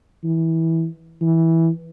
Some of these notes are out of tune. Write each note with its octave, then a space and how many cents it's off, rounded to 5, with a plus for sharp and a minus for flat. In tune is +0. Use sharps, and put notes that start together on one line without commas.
E3 -15
E3 -10